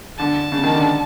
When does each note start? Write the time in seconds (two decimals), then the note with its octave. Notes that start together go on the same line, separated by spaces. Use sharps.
0.18 D3 A5
0.52 C#3
0.64 D#3
0.74 D3